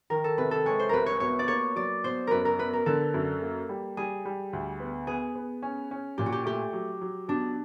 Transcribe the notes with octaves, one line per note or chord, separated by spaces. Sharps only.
D#3 A#4
A4
C3 B4
A4
G#3 C#5
C5
C2 A#4 B4
C#5
B2 C#5
D5
A#3 C#5
F#3 D5
B2 C5
F#2 A#4 B4
A#4
B3 B4
A#4
D3 A4
F#2
A#3
G3
G3 G#4
G3
D2
B3
B3 G#4
B3
C#4
C#4
A#2 G4
F#4
G4
A3 G4
F#3
F#3
B2 D4